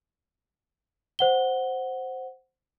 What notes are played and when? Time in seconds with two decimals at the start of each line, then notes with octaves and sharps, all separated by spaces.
1.19 C5 F#5 G7